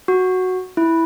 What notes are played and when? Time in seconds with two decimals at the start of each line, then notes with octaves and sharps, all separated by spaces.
0.08 F#4
0.77 E4